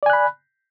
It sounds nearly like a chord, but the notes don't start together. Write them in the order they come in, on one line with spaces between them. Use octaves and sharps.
D5 G#5 F#6 B5